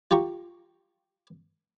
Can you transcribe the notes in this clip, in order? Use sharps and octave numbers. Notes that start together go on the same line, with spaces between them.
F4 G4 A#5 C#6